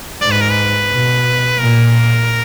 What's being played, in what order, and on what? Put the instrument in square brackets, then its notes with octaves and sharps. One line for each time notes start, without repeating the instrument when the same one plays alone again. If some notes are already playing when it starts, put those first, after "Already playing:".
[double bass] G#2 [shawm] D5
[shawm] B4
A#4
B4
[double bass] B2
[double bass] A#2 [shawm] A#4